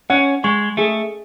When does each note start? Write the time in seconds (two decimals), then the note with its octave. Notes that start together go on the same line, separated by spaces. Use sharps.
0.10 C#4 F#5
0.44 G#3 C#6
0.77 A3 G#4